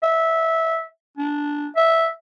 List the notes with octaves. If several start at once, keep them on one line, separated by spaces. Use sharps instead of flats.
E5
D4
E5